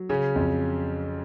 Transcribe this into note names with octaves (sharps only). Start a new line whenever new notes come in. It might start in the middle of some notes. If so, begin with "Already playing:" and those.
Already playing: F#3
C#3 C#4
F2